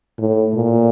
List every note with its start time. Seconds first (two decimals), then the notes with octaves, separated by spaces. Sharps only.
0.19 A2
0.54 A#2